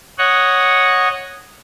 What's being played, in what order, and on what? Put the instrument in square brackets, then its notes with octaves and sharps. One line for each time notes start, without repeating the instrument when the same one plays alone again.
[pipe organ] C#5 D#5 F#5